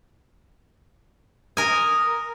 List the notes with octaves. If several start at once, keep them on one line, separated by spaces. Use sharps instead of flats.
A#4 G#5 D#6